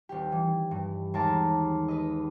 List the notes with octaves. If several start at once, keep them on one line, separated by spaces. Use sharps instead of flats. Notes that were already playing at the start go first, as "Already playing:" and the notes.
D#1 G4
E3
G2
D#2 G#3 A#4 E5 A5
B4 D#5